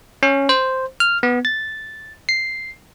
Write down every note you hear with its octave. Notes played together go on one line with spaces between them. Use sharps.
C#4
C5
F6
B3
A6
C7